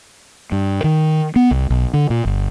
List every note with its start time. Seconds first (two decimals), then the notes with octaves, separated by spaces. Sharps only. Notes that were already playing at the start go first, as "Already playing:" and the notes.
0.52 G2
0.84 D#3
1.36 B3
1.51 C2
1.70 B1
1.94 D3
2.10 A#2
2.25 G1